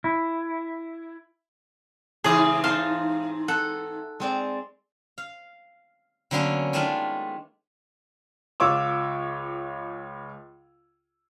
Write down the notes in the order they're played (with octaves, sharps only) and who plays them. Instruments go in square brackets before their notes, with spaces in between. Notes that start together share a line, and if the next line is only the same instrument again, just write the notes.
[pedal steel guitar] E4
[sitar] G#2 E3 C4 [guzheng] C#3 [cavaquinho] G#4 D#6
[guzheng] D#4 C5 A5 [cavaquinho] F5 C6
[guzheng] A4 [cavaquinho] F#5
[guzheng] G#3 C4 D5
F5
D3 F#3 A#3 B3 C#4 D4
D#3 G#3 A3 D4 F4
[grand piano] C#2 F4 C#5 D6 E6